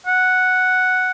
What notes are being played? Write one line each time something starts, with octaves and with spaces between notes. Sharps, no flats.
F#5